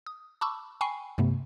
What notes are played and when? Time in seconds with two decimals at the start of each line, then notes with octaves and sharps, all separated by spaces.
0.06 D#6
0.41 A5 B5 C#6 D6 E6
0.81 G5 G#5 B5 C#6 C7
1.18 G2 C3 A3 B3